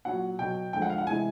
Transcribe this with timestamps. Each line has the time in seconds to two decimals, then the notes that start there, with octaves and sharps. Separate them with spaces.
0.05 A#2 F#3 F#5
0.39 B2 F#3 G5
0.73 D3 F3 G#3 G5
0.82 F#5
0.90 F5
0.98 F#5
1.07 C3 E3 G#3 G#5